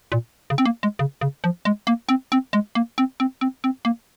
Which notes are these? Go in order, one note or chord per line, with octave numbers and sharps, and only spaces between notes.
A#2
C#3
C4
A#3
G#3
C#3
C#3
F3
G#3
A#3
C4
C4
G#3
A#3
C4
C4
C4
C4
A#3